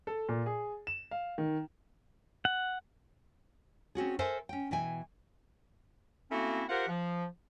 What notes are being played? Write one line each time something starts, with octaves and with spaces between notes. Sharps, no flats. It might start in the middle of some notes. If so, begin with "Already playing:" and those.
A4
A#2
G#4
E7
F5
D#3
F#5
C4 C#4 F#4 G#4
A4 A#4 C5 E5 G#5
C#4 G5
B2 E3 G5 G#5
A3 A#3 C4 C#4 E4 F#4
F4 G4 A#4 C5 F#5
F3